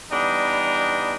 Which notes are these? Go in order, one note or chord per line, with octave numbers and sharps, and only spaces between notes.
E3 G3 B3 D4 D#4